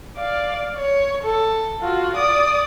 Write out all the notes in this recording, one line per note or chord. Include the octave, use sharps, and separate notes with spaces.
D5 F5
C#5
A4
F4 F#4
D5 D#6